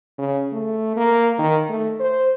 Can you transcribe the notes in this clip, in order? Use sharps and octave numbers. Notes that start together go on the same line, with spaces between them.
C#3
A3
A#3
D#3
A3
C5